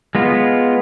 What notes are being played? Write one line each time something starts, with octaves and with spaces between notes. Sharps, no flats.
G#3 B3 F4